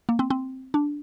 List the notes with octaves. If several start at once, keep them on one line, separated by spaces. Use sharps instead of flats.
A#3
C4
C4
D4